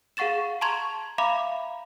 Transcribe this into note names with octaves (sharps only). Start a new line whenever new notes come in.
G#4 F5 F#5 C#6 A6 E7
A5 A#5 C6 C#6 G#6 F7
E5 F5 A#5 B5 D6